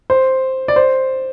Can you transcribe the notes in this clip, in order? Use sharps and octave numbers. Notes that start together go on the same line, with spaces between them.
C5
D5
C5